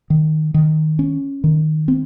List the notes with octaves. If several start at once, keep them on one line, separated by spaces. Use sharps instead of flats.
D#3
D#3
C#4
D#3
C4